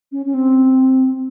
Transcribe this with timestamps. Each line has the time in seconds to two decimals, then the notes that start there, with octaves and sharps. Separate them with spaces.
0.12 C#4
0.26 C#4
0.34 C4